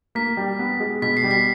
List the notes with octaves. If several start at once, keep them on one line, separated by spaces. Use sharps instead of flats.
A#3 B6
G3
B3
G#3
B2 B6
C7
G3
B6